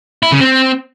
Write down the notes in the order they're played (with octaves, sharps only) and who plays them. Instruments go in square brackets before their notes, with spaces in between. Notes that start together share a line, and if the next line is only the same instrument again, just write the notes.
[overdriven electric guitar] E4
C#3
C4